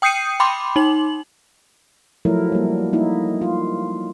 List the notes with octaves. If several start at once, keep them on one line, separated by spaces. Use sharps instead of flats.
G5 D#6 G6 C7 C#7 D#7
G5 B5 C6 D6
D#4 F#7
F3 F#3 A3 E4 A#4
G3 A#3
A#3 D#4 E4
F4